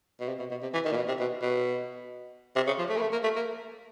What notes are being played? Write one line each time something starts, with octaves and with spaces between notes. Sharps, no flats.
B2
C3
B2
B2
C3
E3
D#3
A#2
B2
C3
B2
B2
C3
C#3
F3
A3
A#3
A3
A#3
A3
A#3